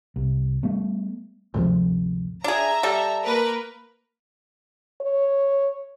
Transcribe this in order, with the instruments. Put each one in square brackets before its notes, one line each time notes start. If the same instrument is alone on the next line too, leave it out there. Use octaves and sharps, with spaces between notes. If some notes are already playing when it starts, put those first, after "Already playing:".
[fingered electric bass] C2
G3 A3 B3
G#1 D2 C3 F3
[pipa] D4 G#4 [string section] E5 A#5
[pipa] G3 A4
[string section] A#3 A#4 B4
[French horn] C#5